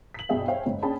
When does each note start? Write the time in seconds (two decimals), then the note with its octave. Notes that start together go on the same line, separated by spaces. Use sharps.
0.14 B6 F#7
0.29 B1 G2 B2 G#4 E5 G5
0.48 C5 C#5 E5 F5 G5 G#5
0.66 F#1 G#2
0.83 C#4 D4 G#4 G5 A5 B5